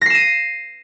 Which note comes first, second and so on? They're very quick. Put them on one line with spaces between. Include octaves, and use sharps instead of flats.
A#6 C7 E7 D#7